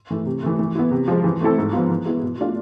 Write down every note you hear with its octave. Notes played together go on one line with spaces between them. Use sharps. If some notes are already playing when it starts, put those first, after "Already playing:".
E3 A3
C3
E3 A3
E3
B3 E4
C3
F3 G#3
E3
A3 C4 E4 A4
G#2
F3 B3 F4
E3
G#3 B3 E4
B2
A3 D4 F4